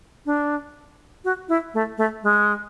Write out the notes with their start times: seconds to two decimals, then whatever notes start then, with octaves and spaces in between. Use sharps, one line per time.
0.26 D4
1.25 F#4
1.49 E4
1.74 A3
1.98 A3
2.23 G#3